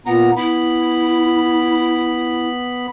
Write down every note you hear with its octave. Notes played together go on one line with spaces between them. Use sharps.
A#2 B3 F#5 A#5
B3 E4 B5